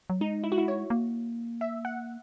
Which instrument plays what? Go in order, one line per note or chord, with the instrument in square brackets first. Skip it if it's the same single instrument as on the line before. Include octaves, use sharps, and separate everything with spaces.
[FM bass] F#3
[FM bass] G#3 [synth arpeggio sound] D#4
[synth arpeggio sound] E4
F#4
E4
C#5
[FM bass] A#3
[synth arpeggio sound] E5
F#5